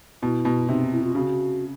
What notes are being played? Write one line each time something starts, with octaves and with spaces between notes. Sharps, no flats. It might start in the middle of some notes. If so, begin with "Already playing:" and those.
B2 E4
B2
C3 D#4
E4
F4
C#3 F#4